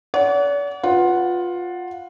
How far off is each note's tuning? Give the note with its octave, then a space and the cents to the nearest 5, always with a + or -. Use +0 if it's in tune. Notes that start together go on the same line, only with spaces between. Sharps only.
D5 -45 F#5 +5
F4 +15 B4 +0 F#5 +0